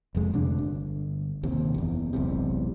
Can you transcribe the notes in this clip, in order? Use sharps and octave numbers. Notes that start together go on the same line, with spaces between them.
F1 F2 G#3
D2 C3 D4
G1
A#1 D#2 C3
F#1 E2
E1 B1 E2 C3